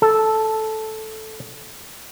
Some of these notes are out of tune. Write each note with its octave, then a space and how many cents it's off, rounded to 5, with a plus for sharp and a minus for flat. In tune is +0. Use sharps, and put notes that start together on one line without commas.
A4 -5